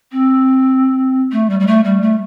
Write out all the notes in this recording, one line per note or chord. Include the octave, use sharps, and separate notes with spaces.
C4
A3
G3
G3
A3
G3
A3